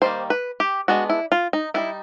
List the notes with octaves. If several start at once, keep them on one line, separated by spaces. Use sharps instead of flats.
D#3 G3 A#3 C5
B4
G4
G#3 B3 D4 F#4
E4
F4
D#4
G3 B3 D#4 E4